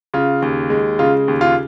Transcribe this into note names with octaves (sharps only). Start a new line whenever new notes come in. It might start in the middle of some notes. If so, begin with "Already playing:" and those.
C#3 F4
D#2
G#3
C#3 F4
D#2
F4